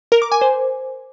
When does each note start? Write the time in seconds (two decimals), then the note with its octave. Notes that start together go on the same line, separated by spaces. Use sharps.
0.12 A#4
0.22 D6
0.32 G#5
0.41 C5